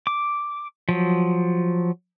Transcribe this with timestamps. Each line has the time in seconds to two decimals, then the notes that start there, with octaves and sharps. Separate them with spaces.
0.07 D6
0.89 F3 F#3